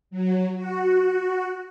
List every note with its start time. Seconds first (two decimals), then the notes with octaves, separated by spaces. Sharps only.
0.11 F#3
0.54 F#4